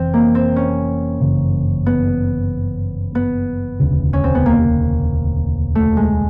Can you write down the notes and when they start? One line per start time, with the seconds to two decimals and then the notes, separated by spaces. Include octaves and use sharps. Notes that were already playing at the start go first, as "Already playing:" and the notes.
Already playing: F1 E3 C4
0.14 A#3
0.35 C4
0.56 C#4
1.21 G1 F#2 C#3 E3
1.86 B3
3.15 B3
3.80 E1 D2 C#3
4.13 C#4
4.24 C4
4.35 B3
4.46 A#3
5.75 A3
5.97 G#3